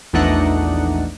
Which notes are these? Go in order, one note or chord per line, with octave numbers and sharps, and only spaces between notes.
A#1 E2 A3 D4 D#4 F#5